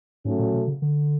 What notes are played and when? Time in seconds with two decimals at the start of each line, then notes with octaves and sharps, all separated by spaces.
0.25 G#2 C#3 F#3 A3 C#4 F#4
0.39 A#2
0.54 B2
0.67 C#3
0.82 D3